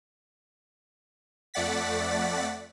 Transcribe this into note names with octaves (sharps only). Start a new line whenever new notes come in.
F2 A3 D5 F#5 A6 B6